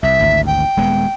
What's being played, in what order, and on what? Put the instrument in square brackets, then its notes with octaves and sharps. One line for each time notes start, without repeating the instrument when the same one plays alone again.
[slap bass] C2 [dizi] E5
[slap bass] G#1 D2
[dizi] G5
[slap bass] D#1 G#3 B3